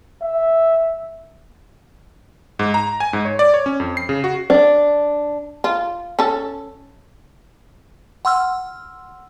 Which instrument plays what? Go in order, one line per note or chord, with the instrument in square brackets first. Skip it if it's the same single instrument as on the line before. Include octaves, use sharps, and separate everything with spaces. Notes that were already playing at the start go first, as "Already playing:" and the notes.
[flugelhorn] E5
[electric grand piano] G#2
A#5
G#5
G#2
C#5
D5
C#5
C#4
F2
C7
C#3
F#4
[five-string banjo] D4
[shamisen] F4
C#4 A4
[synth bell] F#5 C6 E6 F6